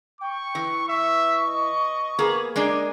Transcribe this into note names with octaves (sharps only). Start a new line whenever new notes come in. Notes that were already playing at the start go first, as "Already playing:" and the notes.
G5 C#6
E3
E5 C#6
D#5
A#3 B3 G#4
G#3 A#3 D4 G#4 G#5